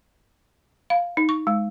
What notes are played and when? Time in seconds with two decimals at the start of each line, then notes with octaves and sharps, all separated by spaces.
0.90 F5
1.17 D#4
1.29 C#6
1.47 G#3